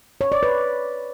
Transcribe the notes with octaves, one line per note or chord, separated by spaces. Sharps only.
C#5
D5
B4